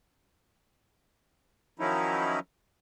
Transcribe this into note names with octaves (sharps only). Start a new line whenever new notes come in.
D#3 F3 F#3 C#4 D#4 E4